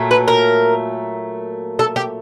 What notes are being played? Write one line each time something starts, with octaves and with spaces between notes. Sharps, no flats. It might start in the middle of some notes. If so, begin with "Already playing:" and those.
Already playing: A#2 F#3 A3
B4
A#4
A4
G4